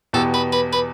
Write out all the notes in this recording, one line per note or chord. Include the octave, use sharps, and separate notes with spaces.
E2 B2 B3 G4 A4
B4
B4
B4